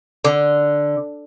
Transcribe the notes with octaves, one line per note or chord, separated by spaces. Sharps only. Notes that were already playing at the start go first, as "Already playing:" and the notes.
D3